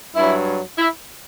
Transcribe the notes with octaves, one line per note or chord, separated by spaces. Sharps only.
G2 F#3 E4
E4